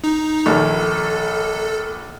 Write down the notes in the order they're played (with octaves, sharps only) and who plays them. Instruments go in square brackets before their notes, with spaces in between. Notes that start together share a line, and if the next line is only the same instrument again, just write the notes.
[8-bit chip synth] D#4
[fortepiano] A#1 D#2 [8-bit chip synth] A4